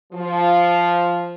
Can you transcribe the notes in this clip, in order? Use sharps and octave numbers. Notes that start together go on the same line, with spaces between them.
F3